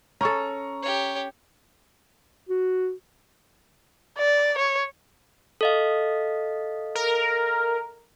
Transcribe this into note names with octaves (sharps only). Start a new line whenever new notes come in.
C#4 A4 A#5 C#6
G4 C#5
F#4
D5
C#5
A4 D#5 F5
A#4